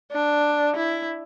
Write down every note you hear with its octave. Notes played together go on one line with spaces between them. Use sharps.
D4
E4